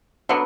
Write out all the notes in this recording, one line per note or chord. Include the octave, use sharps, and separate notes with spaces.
D3 F#3 B3